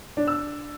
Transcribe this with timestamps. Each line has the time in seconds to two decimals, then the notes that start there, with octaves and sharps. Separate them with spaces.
0.17 D4
0.27 E6